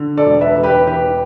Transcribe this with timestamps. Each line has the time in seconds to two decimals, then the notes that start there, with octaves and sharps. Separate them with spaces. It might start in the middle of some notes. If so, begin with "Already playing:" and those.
Already playing: D3
0.17 A4 D5
0.26 E1
0.41 B4 E5
0.56 E1
0.63 G4 B4
0.87 E3 G4 B4